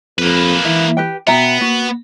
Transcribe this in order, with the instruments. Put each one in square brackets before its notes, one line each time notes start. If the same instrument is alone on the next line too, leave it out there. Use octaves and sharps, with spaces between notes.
[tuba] F2 [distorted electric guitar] A#3 B4
[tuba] E3 [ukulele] E5
[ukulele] G4 B4 G5
[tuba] B2 [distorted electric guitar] B3 [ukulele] E5 G5 A#5
[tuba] A#3 [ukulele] F#4